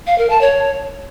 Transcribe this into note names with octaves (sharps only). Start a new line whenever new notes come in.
F5
A#4
A5
C#5